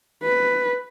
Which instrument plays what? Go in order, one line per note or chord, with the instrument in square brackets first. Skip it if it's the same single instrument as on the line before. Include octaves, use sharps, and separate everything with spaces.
[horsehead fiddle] B4